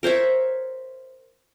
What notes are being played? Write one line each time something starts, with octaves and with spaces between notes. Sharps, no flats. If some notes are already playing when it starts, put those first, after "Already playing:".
A#4 C5 C#5 E5